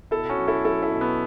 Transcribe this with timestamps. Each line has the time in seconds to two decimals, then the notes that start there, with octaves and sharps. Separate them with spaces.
0.11 B2 E4 A4
0.29 C#4 F#4
0.38 F#3
0.48 E4 A4
0.65 F#3 E4 A4
0.83 E4 A4
0.92 B2
1.01 B3